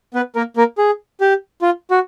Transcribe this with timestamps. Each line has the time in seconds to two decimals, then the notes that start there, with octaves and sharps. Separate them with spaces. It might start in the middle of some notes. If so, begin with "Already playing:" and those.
0.14 B3 B4
0.35 A#3 A#4
0.57 A#3 A#4
0.78 G#4
1.21 G4
1.62 F4
1.91 F#4